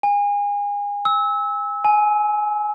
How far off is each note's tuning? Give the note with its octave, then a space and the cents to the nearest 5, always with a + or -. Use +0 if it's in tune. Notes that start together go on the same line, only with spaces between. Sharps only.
G#5 -30
E6 -25
G#5 +15